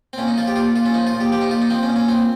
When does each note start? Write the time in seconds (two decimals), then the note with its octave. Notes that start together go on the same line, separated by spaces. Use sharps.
0.13 C4
0.18 A#2 C#4
0.28 D#4
0.37 F3 F4
0.47 G4
0.56 A#2 F4
0.75 A#2 F4
0.86 C#4
0.94 F3 D#4
1.07 F4
1.14 A#2
1.20 G4
1.32 F3 G4
1.42 D#4
1.51 A#2 F4
1.62 D#4
1.70 F3 C4
1.83 C#4
1.90 A#2
1.96 C#4
2.08 A#2 C4